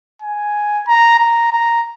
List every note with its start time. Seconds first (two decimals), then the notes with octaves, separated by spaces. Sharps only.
0.22 G#5
0.88 A#5
1.19 A#5
1.52 A#5